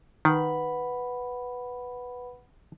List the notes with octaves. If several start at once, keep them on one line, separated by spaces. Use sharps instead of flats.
D#3 B4 F#5 B5